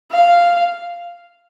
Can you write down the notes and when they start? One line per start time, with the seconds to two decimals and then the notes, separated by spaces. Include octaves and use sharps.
0.11 F5